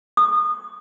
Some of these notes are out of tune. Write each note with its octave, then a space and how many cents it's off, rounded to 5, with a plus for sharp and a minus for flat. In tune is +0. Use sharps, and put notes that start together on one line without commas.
D#6 -25